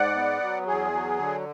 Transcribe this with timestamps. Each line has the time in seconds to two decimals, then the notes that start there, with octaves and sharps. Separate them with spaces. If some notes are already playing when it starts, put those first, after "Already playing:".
Already playing: G#2 D5 F#5
0.15 B3
0.41 F#3
0.66 E2 G#4
0.92 F#3
1.18 D3